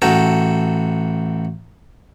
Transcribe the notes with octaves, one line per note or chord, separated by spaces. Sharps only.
A1 F#4 A4 G5 A#5